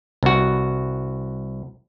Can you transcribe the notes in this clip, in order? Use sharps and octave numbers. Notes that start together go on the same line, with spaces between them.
C2 F#4